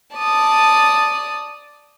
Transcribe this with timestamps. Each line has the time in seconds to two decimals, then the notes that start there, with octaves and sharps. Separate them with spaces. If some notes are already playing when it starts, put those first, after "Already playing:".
0.15 D5 A5 D#6